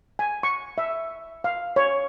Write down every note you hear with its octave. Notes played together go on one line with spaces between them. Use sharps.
G#5
C#6
E5
F5
C#5